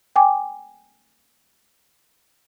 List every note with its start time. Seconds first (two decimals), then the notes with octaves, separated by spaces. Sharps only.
0.16 G5 G#5 D6